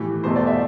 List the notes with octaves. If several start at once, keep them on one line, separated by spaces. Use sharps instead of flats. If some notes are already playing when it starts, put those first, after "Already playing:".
Already playing: A2 E3 G4
E2 B2 A3 C5
D5
E5